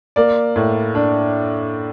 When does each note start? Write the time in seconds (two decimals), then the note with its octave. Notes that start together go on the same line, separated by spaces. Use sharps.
0.16 A#3 D5
0.56 A2
0.95 D4